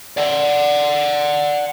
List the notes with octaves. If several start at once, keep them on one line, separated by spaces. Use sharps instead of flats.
D5 F#5